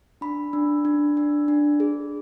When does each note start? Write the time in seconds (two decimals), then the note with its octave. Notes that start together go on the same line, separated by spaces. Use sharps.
0.21 D4 B5
0.53 D4
0.85 D4
1.17 D4
1.48 D4
1.80 G#4